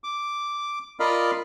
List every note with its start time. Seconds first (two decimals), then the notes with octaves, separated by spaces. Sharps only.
0.04 D6
1.00 F4 A#4 D5 D#5 F5 B5